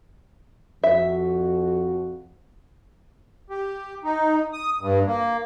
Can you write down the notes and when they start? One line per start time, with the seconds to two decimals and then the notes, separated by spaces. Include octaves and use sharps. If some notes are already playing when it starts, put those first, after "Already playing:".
0.84 F2 F#4 E5
3.50 G4
4.04 D#4
4.53 D#6
4.81 G2
5.07 A#3